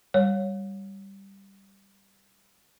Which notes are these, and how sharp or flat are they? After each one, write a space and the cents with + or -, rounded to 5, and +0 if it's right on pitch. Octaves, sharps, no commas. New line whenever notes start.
G3 +0 C#5 +0